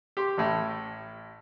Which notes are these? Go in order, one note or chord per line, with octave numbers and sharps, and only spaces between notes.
G4 C6
A1 A2